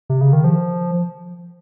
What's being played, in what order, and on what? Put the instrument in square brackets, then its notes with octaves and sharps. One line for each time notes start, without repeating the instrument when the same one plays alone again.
[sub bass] C3
C#3
D#3
F3